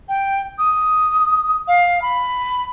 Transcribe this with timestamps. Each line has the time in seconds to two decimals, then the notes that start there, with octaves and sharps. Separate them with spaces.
0.09 G5
0.59 D#6
1.68 F5
2.02 B5